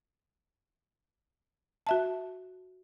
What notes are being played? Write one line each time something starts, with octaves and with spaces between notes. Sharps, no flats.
F#4 E5 A5